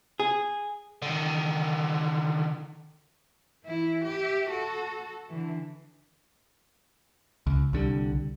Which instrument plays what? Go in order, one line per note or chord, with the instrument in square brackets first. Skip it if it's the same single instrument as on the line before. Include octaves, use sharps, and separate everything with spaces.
[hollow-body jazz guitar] G#4
[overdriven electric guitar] D3 D#3
[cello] E3 E4
G4 E5
F#4 A4
D3 E3
[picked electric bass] C#2
C2 D3 G3